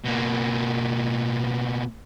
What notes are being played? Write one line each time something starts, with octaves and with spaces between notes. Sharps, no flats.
B2 A#3